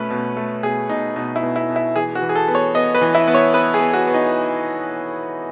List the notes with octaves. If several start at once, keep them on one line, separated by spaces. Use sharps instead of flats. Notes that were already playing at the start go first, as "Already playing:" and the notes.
Already playing: B2 A3 C#4 B4
B2
A3
B2 G#4
B2 D#4
B2 D#4
E4
B2
E4
B2
E4
E3 G#4
F#4
E3
G#4
A4
B3
C#5
B3 D#5
B4
E3
E4
B3
C#5
B3 B4
G#4
B3
F#4
B3
D#4